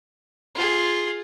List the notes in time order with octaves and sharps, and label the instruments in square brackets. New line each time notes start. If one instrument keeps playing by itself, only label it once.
[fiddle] F4 G#4